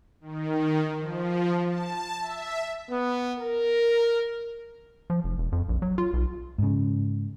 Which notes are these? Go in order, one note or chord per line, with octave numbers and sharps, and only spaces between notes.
D#3
F3
A5
E5
B3
A#4
F3
F1
E1
F2
A#1
F#3
F4
B1
G#2 C#3